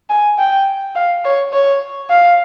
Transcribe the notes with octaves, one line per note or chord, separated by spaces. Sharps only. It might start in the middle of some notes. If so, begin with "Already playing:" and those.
G#5
G5
F5
C#5
C#5
F5